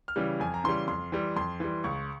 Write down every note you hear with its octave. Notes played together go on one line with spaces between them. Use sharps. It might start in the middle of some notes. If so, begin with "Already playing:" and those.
F6
C#3 E3 G3
F2 G#5
A#5
C#3 E3 G3 C6
F2 C6
E3 G3
F2 C6
E3 G3
C#2 C#6